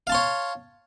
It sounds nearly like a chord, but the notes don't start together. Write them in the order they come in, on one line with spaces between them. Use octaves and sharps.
F5 A5 C6 C#5